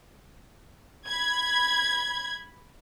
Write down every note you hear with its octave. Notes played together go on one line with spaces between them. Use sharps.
B5 G#6